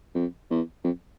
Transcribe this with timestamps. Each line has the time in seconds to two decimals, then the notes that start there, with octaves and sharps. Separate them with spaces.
0.15 F2
0.50 E2
0.84 F2